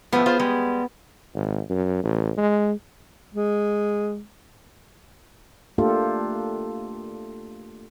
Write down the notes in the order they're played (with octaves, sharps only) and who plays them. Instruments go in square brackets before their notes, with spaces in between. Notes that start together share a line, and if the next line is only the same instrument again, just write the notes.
[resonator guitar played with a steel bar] A2 F3 [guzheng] B3
[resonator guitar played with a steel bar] F4 G#4 C5
G3 G#3
[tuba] G#1
F#2
A1
G#3
[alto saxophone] G#3
[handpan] A3 A#3 D4 F4 G4 A4